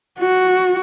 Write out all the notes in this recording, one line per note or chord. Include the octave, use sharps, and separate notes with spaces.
F#4